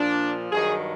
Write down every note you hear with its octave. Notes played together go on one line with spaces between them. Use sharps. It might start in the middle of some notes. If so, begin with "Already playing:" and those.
Already playing: A#2 F3 D4
G2 D#3 F#3 G#4